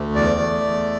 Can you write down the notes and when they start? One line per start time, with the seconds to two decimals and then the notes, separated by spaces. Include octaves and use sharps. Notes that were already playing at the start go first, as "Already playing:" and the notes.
Already playing: D2 A3
0.15 E2 D5
0.40 A3
0.64 E2